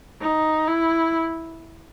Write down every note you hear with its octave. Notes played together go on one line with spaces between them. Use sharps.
D#4
E4